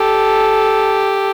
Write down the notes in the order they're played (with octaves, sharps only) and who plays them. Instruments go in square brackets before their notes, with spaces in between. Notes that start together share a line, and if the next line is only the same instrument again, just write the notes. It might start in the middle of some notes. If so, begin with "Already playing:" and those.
Already playing: [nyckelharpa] G4 [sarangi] A4